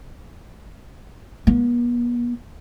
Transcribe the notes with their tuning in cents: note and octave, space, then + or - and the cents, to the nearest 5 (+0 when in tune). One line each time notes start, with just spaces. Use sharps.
B3 -45